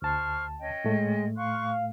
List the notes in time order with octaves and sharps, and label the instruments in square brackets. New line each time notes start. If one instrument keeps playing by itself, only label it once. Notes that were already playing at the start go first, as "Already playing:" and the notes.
[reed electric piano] D2 A5 [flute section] C5 C#6 F6
[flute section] C#4 D#5 G5
[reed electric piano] A2 A3 [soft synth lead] G#3
[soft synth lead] F5 [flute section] C6 C#6 F#6